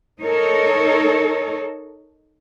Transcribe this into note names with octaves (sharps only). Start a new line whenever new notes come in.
D#4 A4 A#4 C#5